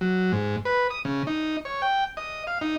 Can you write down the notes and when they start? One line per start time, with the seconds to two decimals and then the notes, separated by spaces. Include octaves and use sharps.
0.01 F#3
0.32 G#2
0.65 B4
0.90 D#6
1.05 C#3
1.27 D#4
1.65 C#5
1.82 G5
2.17 D#5
2.47 F5
2.61 D#4